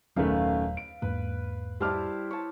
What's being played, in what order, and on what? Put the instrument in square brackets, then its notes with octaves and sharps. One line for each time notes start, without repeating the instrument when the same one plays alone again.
[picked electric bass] D#1 F#3 [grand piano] F#2 D#3 A3 [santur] B4 F5
[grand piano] D7
[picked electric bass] E2 G#2 A#3 [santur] B4
[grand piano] G3 A5 F6 [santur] E4 G4 C5
[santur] C#5 A5